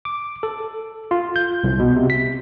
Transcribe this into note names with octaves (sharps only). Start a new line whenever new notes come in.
D6
A4
F4
G6
C2
B2
C3
B6